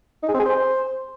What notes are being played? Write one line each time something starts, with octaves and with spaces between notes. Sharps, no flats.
D#4
G#4
C4
G#4
C5